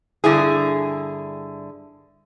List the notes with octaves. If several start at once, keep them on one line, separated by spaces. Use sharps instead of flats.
G2 D3 E4 G#4